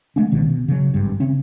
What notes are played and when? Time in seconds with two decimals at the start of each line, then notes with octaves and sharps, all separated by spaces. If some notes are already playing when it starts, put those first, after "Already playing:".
0.16 G#3 A3 C#4 D4
0.31 C2 B2 D#3 C#4
0.47 B2
0.68 C#3 F#3
0.94 G#1 G2
1.20 C#3 C4 C#4